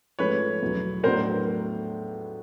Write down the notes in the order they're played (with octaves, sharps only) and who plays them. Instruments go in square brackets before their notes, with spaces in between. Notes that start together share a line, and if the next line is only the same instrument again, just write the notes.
[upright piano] G#2 F3 A3 C#4 F4 [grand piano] B4 C#5
[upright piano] E2 B2 F#3
[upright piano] A2 F#3 B3 D4 [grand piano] A#4 C5